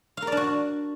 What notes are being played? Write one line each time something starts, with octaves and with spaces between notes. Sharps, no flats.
D4 F#4 A#4 D5 F5